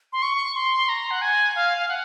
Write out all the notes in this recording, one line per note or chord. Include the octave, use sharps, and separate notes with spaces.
C6
C#6
C6
A#5
F#5
G#5
F5
F5
F#5